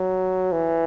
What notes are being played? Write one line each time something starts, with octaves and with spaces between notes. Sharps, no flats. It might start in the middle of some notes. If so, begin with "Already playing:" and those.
Already playing: F#3
E3